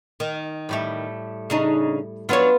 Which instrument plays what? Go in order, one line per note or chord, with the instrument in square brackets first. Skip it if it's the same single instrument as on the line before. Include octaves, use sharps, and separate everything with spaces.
[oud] D#3
[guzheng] A2 G3 A3
[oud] C#3 D4 D#4
[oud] F#3 D4 C#5 [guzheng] B3 F4